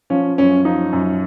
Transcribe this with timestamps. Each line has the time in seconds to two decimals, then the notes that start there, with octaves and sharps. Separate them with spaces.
0.10 F3 C#4
0.38 F#2 C#4
0.65 F3 D#4
0.93 F#2